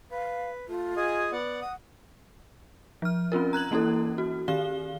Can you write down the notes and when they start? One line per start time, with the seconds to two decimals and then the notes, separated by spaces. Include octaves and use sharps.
0.11 B4 F5
0.68 A3 F4
0.96 G#4 D#5 G#5
1.32 B3 D5 F#5
1.62 F#5 D#6
3.02 F3 F6
3.32 C4 C#4 F4 A#4
3.53 A#5 F#6 G#6 F#7
3.71 E3 A#3 C#4 E4 A4
4.18 F#4
4.48 D#3 G4 F5 G7